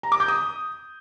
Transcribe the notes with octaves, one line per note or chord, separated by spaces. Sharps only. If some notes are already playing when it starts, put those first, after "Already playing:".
A#5
D6
G6
D#6